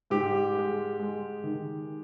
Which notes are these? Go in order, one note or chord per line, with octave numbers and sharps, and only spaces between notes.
G#2 G4
G#3
G#3
D#3